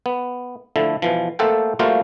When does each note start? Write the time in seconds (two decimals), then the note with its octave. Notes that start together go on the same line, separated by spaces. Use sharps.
0.06 B3
0.76 D3 F3 A3 E4
1.02 B2 E3 F3
1.39 A3 A#3 A4 C5 F#5 G5
1.79 G3 A3 A#3 F4 F#4 C5